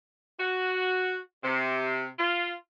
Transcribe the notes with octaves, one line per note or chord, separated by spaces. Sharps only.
F#4
C3
F4